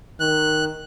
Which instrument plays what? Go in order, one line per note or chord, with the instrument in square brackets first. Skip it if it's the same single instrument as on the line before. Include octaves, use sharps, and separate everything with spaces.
[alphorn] D#3 [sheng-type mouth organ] F#6